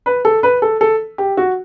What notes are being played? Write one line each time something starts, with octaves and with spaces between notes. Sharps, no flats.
B4
A4
B4
A4
A4
G4
F#4